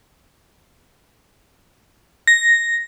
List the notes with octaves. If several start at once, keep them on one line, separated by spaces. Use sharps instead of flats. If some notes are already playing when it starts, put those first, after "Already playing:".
A#6